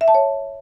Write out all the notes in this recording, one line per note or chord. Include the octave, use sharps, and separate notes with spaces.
E5
A5
C#5